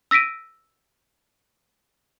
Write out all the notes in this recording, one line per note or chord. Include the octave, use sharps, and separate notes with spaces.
E6 A#6 B6 D7 D#7